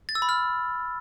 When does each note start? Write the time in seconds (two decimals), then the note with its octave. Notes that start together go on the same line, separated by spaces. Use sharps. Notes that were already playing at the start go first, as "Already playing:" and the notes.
0.09 A6
0.15 E6
0.22 B5
0.29 F6